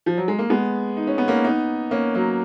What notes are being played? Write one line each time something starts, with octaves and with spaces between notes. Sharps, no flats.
F3
F#3
G#3
A#3
G#3 B3
D#4
C#4
B3
A#3 C#4
B3 D#4
A#3 C#4
F#3 A#3